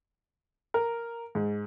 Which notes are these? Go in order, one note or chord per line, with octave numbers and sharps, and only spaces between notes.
A#4
G#2